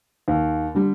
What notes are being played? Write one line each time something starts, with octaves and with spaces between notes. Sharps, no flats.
D#2
D3 G3